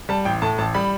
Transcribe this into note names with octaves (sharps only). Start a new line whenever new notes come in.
G3 A5
A1 G5
A2 A5
A1 A5
G3 B5